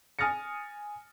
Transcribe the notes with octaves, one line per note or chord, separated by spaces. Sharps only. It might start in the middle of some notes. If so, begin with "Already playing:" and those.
G#5 D#6 F6 A6 A#6 C#7